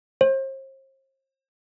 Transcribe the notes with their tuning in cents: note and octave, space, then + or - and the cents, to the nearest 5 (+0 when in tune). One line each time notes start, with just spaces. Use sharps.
C5 +40